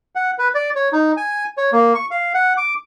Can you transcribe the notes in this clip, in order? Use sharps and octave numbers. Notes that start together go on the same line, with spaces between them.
F#5
B4
D5
C#5
D#4
G#5
C#5
A#3
C#6
F5
F#5
D6